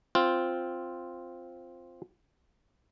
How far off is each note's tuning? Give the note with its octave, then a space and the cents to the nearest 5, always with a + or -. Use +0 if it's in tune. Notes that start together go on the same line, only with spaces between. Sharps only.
C4 +0 F4 +0